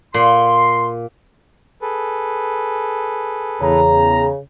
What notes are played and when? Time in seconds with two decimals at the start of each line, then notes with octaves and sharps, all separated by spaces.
0.14 A#2 C6
1.82 G#4 A4 B4
3.61 E2 C#3 A#5